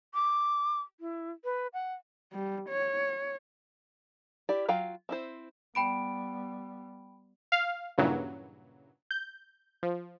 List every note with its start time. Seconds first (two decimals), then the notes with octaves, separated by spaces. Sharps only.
0.14 D6
1.00 E4
1.44 B4
1.73 F#5
2.33 G3
2.69 C#5
4.49 E4 G4 D5
4.68 F#3 F4 F5 G5
5.09 C4 E4 C5
5.75 G3 B3 G5 B5 D7
7.52 F5
7.98 G2 A#2 C#3 E3 F#3
9.11 G6
9.83 F3